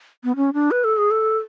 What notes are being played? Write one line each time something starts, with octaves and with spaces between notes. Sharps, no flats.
B3
C#4
D4
B4
A4
G#4
A4